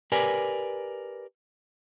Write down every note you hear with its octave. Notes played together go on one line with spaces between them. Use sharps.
G4 A#4 B4 D5 G#5